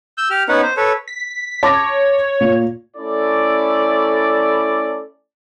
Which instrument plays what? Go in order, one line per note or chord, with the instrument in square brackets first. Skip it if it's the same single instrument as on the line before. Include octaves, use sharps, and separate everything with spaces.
[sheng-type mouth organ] E6 G6
G4 F6
B3 C#4 D#4 B4 F#5
C5
A4 B4 C#5
[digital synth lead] B6
[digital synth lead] C#5 [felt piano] A5 D6 A#6
[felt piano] A#2
[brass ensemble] A3 C#4 E4 A4 D5